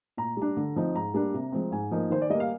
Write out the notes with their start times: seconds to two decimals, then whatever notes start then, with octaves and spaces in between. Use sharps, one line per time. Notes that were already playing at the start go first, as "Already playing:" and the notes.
0.17 A#2 A#5
0.37 G3 D4
0.57 D3
0.76 F3 C4 D#4
0.95 G#2 A#5
1.14 G3 A#3 D4
1.34 C3
1.52 F3 G#3 C4
1.71 G#2 G#5
1.91 F3 A#3 D#4
2.10 D#3 C5
2.22 D5
2.30 G3 A#3 D#5
2.40 F5